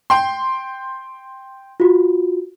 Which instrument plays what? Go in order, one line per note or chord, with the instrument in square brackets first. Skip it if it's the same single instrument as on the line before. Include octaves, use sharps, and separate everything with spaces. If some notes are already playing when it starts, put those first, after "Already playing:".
[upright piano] G5 C6
[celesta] F4 F#4